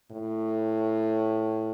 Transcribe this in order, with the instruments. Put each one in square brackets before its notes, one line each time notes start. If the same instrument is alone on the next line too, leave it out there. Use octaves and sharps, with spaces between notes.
[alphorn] A2